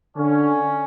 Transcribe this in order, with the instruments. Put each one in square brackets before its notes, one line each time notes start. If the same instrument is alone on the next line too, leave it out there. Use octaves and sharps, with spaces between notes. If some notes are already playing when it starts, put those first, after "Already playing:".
[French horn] D3 [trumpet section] C#4